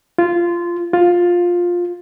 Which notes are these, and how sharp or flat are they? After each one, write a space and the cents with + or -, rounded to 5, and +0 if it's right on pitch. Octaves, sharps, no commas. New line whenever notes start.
F4 -15
F4 +10